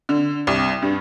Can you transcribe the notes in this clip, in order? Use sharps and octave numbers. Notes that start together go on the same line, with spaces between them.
D3
C2
G2